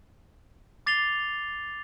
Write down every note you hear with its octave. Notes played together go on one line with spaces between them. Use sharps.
D6 A6 C7 F7 G7